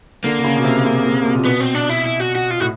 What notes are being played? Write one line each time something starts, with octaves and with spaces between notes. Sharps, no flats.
D3 A#3
D3
C#3
B2
C3
C#3
C3
B2
A#2
B2 B3
C4
D4
E4
E4
F#4
F#4
F4
A2 F#4